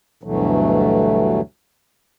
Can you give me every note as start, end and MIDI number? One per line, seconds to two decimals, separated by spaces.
0.23 1.41 38
0.23 1.41 43
0.23 1.41 47
0.23 1.41 52
0.23 1.41 54
0.23 1.41 57